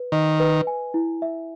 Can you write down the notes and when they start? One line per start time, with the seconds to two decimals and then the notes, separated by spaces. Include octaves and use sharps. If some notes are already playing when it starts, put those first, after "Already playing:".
Already playing: B4
0.12 D#3 D#5
0.40 B4
0.67 G#5
0.94 E4
1.22 E5